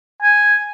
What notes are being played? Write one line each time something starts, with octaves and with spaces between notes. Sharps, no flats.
G#5